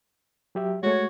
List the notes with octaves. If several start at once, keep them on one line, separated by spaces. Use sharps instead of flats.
F#3 G4 E5
G#3 A3 F#4 C#5